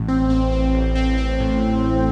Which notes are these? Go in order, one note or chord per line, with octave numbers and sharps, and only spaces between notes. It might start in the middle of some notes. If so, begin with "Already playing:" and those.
Already playing: A1
C4
C4
C4
A1
C4
C4
A2